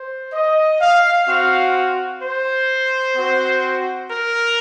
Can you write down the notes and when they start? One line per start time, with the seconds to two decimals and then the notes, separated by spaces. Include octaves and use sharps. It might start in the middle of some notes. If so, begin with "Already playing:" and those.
Already playing: C5
0.32 D#5
0.80 F5
1.26 C4 F#4 F5
2.21 C5
3.14 C4 F#4
4.09 A#4